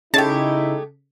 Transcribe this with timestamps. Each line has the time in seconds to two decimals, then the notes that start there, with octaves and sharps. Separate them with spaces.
0.14 C#3 G#3 A3 D#4 E4 G4 A5